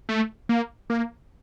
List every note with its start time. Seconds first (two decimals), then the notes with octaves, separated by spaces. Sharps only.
0.09 A3
0.49 A#3
0.90 A#3